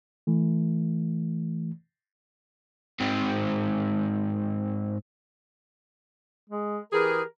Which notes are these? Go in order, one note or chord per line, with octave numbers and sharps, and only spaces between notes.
E3 A3
G#2 C4
G#3
E3 G4 G#4 A#4